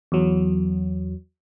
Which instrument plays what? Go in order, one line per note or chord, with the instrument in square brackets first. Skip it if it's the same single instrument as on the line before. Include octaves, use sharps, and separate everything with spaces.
[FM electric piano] E2 F#3